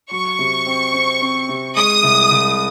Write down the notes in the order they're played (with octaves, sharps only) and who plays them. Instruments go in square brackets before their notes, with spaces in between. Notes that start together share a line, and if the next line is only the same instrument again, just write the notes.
[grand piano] F#3 [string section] C#6
[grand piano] C3
C4
C4
C4
C3
[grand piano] G#3 [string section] D#6
[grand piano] C2
C2